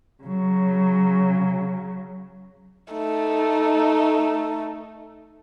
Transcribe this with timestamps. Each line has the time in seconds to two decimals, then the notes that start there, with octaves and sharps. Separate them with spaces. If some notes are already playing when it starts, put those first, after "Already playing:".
0.23 C#3 F#3
2.94 A3 D#4